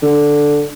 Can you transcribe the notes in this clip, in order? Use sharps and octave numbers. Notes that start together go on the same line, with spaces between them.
D3